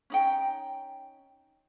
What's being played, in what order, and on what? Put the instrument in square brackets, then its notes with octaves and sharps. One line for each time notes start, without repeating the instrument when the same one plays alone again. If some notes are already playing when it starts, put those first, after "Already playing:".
[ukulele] C#4 D#4 G5